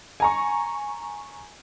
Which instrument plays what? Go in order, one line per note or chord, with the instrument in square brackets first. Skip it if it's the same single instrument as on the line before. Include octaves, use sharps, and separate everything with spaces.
[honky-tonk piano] G#5 A#5 C#6